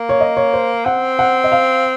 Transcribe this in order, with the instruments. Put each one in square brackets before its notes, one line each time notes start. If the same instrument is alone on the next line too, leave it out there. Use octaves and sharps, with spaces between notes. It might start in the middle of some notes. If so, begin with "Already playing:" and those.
Already playing: [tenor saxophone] A#3
[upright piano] C#5
D#5
C#5
C5
[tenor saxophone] C4 [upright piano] F#5
[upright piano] F#5
D#5
F5